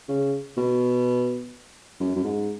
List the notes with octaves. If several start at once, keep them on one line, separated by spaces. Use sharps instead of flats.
C#3
B2
F#2
F#2
G#2